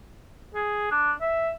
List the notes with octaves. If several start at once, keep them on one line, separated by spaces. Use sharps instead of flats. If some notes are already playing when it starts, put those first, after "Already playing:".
G#4
D4
E5